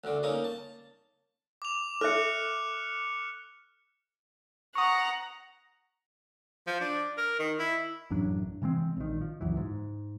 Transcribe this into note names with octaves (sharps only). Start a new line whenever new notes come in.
D2 D3
A#3 C#4 D#4
A5
D6 F7
A4 E5 F6 F#6 C#7
F#5 A#5 C#6 D#6
F3
D4
A#4
D#3
E4
A1 F#2 F#3 D4
C3 E3 G#3 C4
A#1 D#3
F3
C#2 F#2 E3
G#2